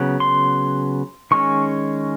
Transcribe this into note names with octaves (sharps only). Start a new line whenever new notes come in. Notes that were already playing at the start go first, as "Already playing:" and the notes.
Already playing: C#3 F#3 B3
C6
D#3 G#3 C#4 C#6